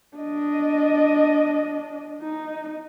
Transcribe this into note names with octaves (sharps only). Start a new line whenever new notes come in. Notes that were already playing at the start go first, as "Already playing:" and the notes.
D4 D#5
D#4